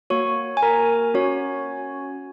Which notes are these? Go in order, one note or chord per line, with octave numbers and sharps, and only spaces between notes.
A#3 F#4 C#5 C#6
G#5
A#4 A#5
C#4 F#4 C#5